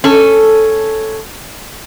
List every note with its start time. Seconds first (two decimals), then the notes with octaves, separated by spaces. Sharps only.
0.04 C#4 A4